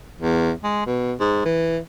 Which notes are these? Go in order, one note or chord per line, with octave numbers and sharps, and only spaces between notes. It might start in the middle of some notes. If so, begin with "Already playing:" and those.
E2
G#3
B2
G#2
E3